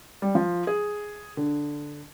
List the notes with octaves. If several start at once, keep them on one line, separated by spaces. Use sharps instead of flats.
G3
F3
G#4
D3